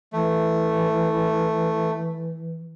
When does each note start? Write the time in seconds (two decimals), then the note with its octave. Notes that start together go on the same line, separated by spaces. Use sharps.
0.13 E3 A3